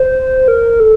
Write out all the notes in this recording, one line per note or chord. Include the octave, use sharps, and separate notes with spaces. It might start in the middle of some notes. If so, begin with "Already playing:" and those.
Already playing: C5
A#4
A4